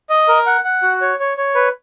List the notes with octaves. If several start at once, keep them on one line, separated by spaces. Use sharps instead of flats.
D#5
A#4
F#5
F#5
F#4
C#5
C#5
C#5
B4